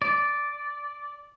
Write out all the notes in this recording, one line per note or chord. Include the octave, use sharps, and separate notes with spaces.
D5